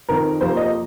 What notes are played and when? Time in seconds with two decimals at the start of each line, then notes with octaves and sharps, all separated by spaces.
0.09 F2 D#3 C4 A#4
0.41 F2 C3 F3 A#3 C5
0.57 D#5